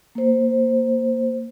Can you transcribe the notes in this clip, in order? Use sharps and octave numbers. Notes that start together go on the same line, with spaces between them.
A#3 C5